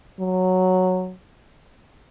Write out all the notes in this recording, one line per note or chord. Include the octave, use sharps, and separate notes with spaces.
F#3